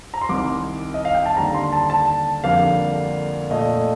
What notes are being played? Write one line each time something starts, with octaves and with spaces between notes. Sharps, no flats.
A#5
C6
C2 C3 D#3 D6
D#5
F5
G5
A5
D#2 D3 G3 A#5
C6
A5
A5
F2 D3 G3 A#3 F5
A#2 A3 D#5